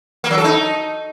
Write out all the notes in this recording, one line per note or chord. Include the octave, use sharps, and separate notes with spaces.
A#3
F#3
A4
D#4